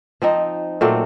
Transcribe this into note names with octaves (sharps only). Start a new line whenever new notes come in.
F3 C4 D#4
A#2 F#3 A3 C4